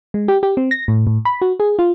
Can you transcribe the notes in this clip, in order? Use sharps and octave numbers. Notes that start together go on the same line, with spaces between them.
G#3
G4
G4
C4
A#6
A2
A2
B5
F#4
G#4
F4